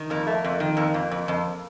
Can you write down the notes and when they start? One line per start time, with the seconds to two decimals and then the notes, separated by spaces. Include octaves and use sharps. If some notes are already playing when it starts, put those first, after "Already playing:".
Already playing: D#3
0.10 F2 A#3
0.27 A3
0.44 F2
0.60 D#3
0.77 F2 A#3
0.94 F2
1.11 F2
1.28 F2